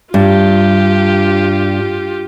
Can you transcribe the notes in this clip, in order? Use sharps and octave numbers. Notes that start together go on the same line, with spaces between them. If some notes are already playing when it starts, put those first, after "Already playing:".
G2 F4 G4